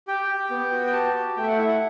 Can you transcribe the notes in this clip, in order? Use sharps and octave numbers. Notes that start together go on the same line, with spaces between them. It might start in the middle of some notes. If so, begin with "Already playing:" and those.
G4 G5
G4
B3
F#4
G5
G4 A5
G4
A3 G5
E5
F#5
E4 E5
F#5